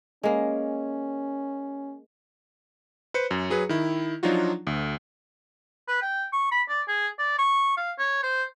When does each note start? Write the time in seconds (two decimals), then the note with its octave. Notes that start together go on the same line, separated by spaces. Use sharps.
0.23 G#3 A#3 C#4
3.14 B4 C5 C#7
3.31 F#2
3.50 F#3 G#4 B4
3.69 D#3 E4
4.23 F3 F#3 D4 D#4 F4 F#4
4.67 D2
5.88 B4
6.02 G5
6.33 C#6
6.52 B5
6.69 D5
6.88 G#4
7.19 D5
7.39 C#6
7.77 F5
7.99 C#5
8.23 C5